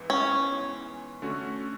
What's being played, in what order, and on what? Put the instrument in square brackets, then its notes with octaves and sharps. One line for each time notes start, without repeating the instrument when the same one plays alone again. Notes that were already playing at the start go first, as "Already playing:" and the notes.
Already playing: [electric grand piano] G#2 E3 B3
[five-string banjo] C#4
[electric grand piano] D3 A3 C#4 F#4